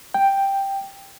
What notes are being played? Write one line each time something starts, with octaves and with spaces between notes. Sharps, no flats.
G5